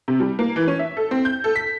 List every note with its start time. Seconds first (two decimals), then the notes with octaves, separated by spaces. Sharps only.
0.08 C3
0.20 G3
0.39 A#3
0.56 E3
0.68 C#4
0.79 E5
0.97 A4
1.11 C4
1.25 G6
1.44 A4
1.56 B6